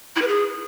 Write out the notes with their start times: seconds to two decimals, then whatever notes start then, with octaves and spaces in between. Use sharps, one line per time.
0.16 E4
0.22 B4
0.28 G#4